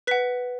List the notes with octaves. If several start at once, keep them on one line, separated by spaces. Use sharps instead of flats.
B4 F#5 B6